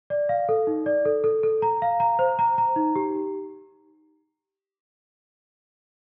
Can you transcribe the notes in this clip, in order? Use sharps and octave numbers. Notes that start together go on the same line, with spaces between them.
D5
F5
A4
D#4
D5
A4
A4
A4
A#5
F5
A#5
C5
A#5
A#5
D#4
G4